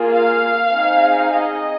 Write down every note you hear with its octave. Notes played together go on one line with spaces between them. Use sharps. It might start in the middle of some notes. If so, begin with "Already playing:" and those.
Already playing: A#3 F4 G#4
F5
C4 D#4 G#4
D#5